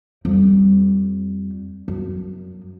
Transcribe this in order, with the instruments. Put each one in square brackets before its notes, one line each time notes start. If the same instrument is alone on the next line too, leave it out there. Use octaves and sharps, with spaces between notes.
[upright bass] F2 G3
F#2